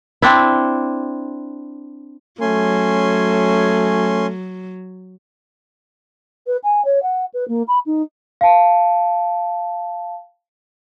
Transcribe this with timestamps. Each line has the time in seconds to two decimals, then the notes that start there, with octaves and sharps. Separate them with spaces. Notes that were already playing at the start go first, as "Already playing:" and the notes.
0.22 C4 D4 E4
2.41 F#3 A3 C#4 G#5 C6
6.46 B4
6.63 G#5
6.84 C#5
7.02 F#5
7.33 B4
7.48 A#3
7.67 B5
7.86 D#4
8.41 F5 A5